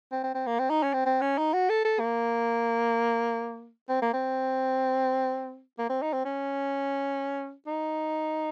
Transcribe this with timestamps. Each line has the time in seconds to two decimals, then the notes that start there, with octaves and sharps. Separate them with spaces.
0.12 C4
0.23 C4
0.35 C4
0.47 A#3
0.59 C4
0.70 D#4
0.83 C#4
0.93 C4
1.06 C4
1.21 C#4
1.38 D#4
1.53 F#4
1.69 A4
1.85 A4
2.00 A#3
3.89 C4
4.02 A#3
4.14 C4
5.79 A#3
5.90 C4
6.02 D#4
6.13 C4
6.25 C#4
7.67 D#4